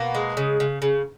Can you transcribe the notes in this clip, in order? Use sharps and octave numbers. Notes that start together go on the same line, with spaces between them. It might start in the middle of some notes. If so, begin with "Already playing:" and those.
Already playing: B2 A#3
G#3
C#3
C#3
C#3